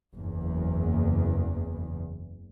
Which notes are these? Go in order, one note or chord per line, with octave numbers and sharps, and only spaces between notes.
F#1 E2